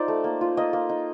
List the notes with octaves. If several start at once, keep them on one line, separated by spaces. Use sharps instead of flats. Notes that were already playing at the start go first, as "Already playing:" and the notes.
Already playing: D#4 F4 C5 D5
A3
A#3
F4
A#3 D#5
A#3
D#4